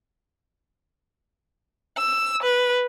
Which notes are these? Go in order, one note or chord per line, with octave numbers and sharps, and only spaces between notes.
E6
B4